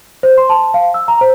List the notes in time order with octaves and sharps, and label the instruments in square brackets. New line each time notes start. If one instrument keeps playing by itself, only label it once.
[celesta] C5
C6
A5
F5
E6
A#5
C5